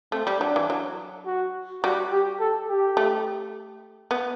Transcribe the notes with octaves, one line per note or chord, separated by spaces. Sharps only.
A3 C4
G3
F#3 D4
E3
F#3
F#4
G3 F#4
G4
A4
G4
A3
B3